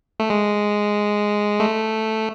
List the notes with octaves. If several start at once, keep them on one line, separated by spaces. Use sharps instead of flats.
A3
G#3
A3